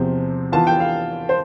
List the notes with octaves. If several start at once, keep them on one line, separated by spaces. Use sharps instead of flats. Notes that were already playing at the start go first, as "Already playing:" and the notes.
Already playing: E2 C3 F3 C4
E3 B3 F4 A5
G5
F5
C5